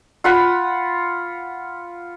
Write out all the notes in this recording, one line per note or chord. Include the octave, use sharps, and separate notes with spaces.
F4 F#5 B5